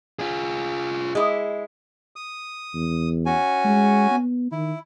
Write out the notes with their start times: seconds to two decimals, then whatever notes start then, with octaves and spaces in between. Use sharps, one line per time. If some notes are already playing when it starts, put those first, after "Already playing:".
0.19 F4 G#4
1.15 G#3 E4
2.16 D#6
2.74 E2
3.26 C#4 F#4 G#5
3.64 G#3
4.11 B3
4.52 D#3 E4